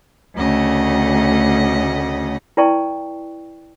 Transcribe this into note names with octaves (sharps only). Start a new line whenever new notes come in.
D2 C#3 A3 D#5 F#5
E4 B4 D5 G5 A5 C#6